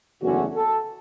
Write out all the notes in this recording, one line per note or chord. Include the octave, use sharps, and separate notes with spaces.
F#1 E2 D3 A3 C#4 F#4
A4